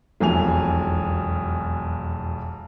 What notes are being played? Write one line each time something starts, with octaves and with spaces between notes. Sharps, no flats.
E1 B1 F2 G#5 F7